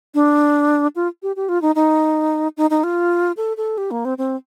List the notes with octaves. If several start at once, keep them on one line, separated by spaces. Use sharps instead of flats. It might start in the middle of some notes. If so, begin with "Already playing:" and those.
D4
F4
G4
G4
F4
D#4
D#4
D#4
D#4
F4
A4
A4
G4
A#3
C4
C4